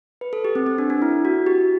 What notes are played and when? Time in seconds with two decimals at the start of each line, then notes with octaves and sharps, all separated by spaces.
0.21 B4
0.33 A4
0.45 G4
0.55 C4
0.67 C4
0.78 D4
0.90 D4
1.02 E4
1.25 F#4
1.46 G4